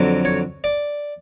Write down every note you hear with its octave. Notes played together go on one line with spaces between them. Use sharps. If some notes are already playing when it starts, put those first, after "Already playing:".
Already playing: F2 D3 F#3
C#5
D5